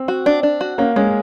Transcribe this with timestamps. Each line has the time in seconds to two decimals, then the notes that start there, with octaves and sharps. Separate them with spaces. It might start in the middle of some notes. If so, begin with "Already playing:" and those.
Already playing: C4
0.08 F#4
0.26 D4
0.43 D4
0.61 F#4
0.78 A#3 C#4
0.96 G#3 C#4